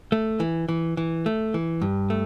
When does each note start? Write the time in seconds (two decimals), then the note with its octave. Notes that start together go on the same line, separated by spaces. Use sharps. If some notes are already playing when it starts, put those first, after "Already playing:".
0.12 A3
0.40 E3
0.69 E3
0.97 E3
1.26 A3
1.54 E3
1.82 G2
2.10 A3